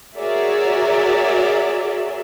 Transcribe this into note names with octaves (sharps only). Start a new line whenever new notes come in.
F#4 G#4 A#4 C#5 D5 E5